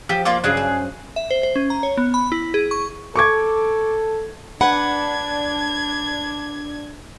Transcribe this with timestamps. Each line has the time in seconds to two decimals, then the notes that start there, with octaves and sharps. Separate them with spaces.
0.09 F3 G4
0.25 A#3 F4 D5
0.44 G2 C#3 F#3 D4 G#4
0.57 C5
1.16 E5
1.31 C5
1.43 C5
1.56 C#4
1.70 A#5
1.83 C#5
1.97 B3
2.14 B5
2.32 E4
2.54 G#4
2.71 C#6
3.16 A4 C#6 D6 G#6
4.61 D4 B4 F#5 G#6